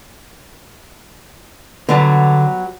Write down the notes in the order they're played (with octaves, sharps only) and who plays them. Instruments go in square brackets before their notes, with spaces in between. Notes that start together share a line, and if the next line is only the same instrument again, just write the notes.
[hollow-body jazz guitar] D3 A5 [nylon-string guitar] F#3 G3 B3